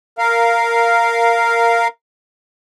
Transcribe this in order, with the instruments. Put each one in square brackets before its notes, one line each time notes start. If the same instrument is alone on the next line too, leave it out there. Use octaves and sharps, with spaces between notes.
[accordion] A#4 F5